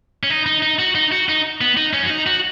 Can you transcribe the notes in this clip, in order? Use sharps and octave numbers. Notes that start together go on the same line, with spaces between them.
C#4
D#4
D#4
D#4
F#4
D#4
F#4
D#4
B3
D#4
C#4
F#4
D#4
F#4